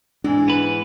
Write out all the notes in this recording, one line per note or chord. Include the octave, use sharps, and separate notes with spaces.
G#2 E3 G#3 D4
B3 B4